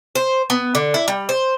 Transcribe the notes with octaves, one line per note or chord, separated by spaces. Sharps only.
C5
B3
D3
E4
G3
C5